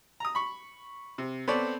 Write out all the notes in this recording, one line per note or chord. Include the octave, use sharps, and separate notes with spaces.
A#5 D#6
B5 C#6
C3
B3 C4 A4 C#5 D5